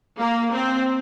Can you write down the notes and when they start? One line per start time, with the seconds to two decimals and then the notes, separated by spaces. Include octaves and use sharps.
0.18 A#3
0.54 C4